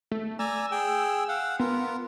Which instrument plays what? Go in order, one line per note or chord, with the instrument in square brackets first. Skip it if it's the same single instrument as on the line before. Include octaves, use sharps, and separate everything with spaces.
[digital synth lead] A3
[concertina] D5 G#5 A#5 [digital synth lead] E6
[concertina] G#4 G5
F5 F#5
[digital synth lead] B3 [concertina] F4 A#4